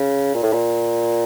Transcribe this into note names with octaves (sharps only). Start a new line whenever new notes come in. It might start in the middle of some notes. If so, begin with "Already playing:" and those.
Already playing: C#3
A#2
A2
A#2